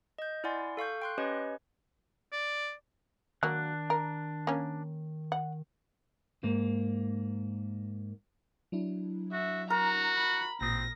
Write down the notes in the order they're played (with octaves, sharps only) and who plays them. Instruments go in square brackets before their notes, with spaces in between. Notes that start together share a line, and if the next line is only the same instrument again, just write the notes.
[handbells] D#5 G6
E4 D5 F#5 G#5 C6
A4 F5 C#6 G6
G5 C6 F#6
C#4 G4 B4 C#5 D#5
[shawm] D5
[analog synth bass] D#3 [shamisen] F#3 A#3 [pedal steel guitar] D4 F#6
[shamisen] A#4
A#3 C#4
F#5
[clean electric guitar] G#2 A#3
[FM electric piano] F#3 D4 E4
[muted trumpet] F#4 [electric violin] E5
[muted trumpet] F#4 [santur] A#4 [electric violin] A#5
[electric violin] B5
[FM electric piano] A1 A#2 D#6 [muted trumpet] C4 [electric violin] A#6